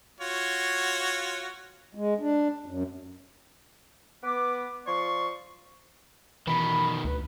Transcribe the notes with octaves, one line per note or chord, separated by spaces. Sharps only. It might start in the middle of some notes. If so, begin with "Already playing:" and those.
F4 F#4 C#5
G#3
D4
F#2
B3 B4 D6
F3 D5 C6 C#6
B2 D#3 E3 B5
D2 B4